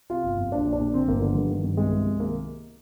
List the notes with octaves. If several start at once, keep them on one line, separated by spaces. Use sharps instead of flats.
C3 F4
G1
F2
A#1 D4
A#1
D4
A#2
D3 C4
G1 A#3
D3
G2
D#3
G2
C2 G#3
C2
C2
D#3 A#3